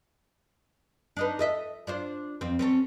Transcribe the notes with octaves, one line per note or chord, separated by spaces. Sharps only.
D4 D#4 B4
A4 D#5 E5
D4 F4 C5
F2 C4
C4 C#4 A4